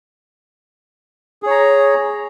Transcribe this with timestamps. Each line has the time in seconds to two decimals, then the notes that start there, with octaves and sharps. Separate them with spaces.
1.43 G#4
1.47 C#5
1.50 A#5